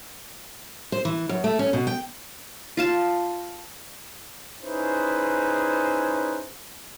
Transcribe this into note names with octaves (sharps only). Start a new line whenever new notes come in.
C5
E3
F#2
A3
C#4
B2
G5
F4 F5 A5
C#4 D#4 E4 G#4 B4 C5